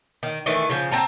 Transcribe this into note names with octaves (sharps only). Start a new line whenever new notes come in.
D#3
D#3 E3 A3
C#3 F3
C4 A5 A#5